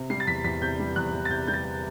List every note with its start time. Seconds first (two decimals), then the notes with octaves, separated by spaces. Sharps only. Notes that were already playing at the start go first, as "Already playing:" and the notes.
Already playing: C3
0.10 G3 C7
0.20 A6
0.27 E2 B6
0.44 E2 B6
0.62 C3 G6
0.79 G3
0.96 E2 F#6
1.13 E2
1.25 A6
1.30 C3 G6
1.47 G3 G6
1.53 A6